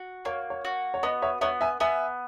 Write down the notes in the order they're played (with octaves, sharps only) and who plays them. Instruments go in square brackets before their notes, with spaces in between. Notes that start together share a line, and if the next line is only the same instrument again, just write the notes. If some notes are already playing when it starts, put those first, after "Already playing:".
Already playing: [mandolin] F#4
[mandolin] A#3 [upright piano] C#5
[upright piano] C#5
[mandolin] F#4
[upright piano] C#5
[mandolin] B3 [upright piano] D#5
[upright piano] C#5 E5
[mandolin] B3 [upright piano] C#5 E5
[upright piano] E5 G#5
[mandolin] B3 [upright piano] E5 G#5